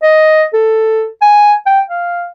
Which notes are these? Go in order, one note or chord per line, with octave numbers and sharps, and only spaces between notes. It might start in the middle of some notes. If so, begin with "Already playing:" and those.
D#5
A4
G#5
G5
F5